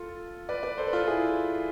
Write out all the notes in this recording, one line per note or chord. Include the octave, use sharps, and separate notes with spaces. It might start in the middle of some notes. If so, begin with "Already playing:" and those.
Already playing: F4 A4
B4 D5
B4 D5
A4 C5
B4
F4 A4
E4 G#4